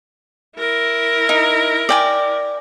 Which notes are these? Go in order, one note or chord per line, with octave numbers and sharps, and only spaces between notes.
E4 A#4
D#4
D5 G5 G#5